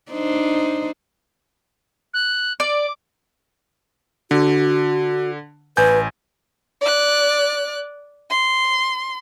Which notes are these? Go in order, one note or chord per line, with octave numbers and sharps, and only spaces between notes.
D4 D#4 C5
F#6
D5 D6
D3 F#4
A1 B4 G#5 G6
D5 F#6
C6